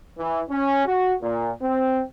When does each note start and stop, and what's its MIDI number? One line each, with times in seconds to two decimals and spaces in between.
0.19 0.41 52
0.49 0.85 61
0.86 1.13 66
1.22 1.51 46
1.61 2.01 60